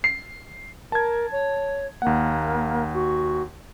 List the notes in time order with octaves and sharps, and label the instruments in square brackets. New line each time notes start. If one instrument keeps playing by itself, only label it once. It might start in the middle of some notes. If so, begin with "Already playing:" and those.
[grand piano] C7
[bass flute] A#4 [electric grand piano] A5 G#6
[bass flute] C#5
[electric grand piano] D#2 F#5 [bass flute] A#3
[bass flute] F#4